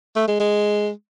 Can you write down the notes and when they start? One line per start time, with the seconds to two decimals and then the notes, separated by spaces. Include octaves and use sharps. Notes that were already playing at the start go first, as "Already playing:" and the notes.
0.16 A3
0.28 G#3
0.40 G#3